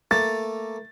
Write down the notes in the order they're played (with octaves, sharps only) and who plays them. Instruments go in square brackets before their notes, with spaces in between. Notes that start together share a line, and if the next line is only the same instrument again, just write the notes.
[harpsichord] A3 A#3 [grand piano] A6